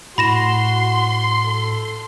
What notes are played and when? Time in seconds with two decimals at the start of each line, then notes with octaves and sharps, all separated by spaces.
0.18 A2 F#4 B5 C6 A#6 E7
1.45 A4